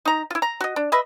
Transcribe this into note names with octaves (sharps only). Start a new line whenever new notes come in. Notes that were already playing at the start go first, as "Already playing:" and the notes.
D#4 A#5
E4 F4
A#5
F#4 D#5
D4
B4 D#5 E5